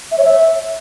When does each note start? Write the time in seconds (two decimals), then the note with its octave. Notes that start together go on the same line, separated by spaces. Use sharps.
0.12 E5
0.18 C#5
0.24 E5